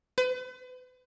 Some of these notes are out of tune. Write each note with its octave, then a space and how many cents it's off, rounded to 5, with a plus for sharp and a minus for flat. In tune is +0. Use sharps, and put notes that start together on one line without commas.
B4 +40